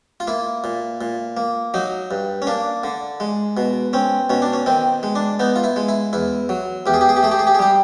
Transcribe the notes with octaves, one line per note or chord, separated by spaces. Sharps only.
F4
A#3 E4
A#2
A#2
A#3
F#3 D#4
G2
C#4
A#3 D4
D3
G#3
B2
C4 C#4
B2 C#4
D4
C#4
D#3 C4
G#3
D4
B3 D#4
F4
E4
G#3
E4
E2 E4
F#3
E2 G4
G#4
G4
G#4
G4
A3 G#4
G4
G#4
G4
G#4
G3 G4